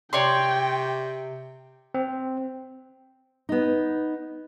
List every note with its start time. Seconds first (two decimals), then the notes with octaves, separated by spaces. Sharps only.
0.13 C3 C#5 D5 G5 C6
1.94 C4
3.49 B3 D#4